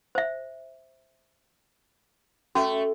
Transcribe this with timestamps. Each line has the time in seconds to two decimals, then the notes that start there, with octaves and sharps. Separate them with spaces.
0.15 C5 E5
2.55 A3 C#4 F#4